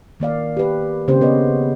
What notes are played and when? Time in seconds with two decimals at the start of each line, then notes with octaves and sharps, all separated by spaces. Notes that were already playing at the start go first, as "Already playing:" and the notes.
0.20 D#3 A#3 D5 F5
0.57 G4 B4
1.08 C#3 A#3 C4 C#4 G4 C5
1.21 B2 B3 B4 C#5 D#5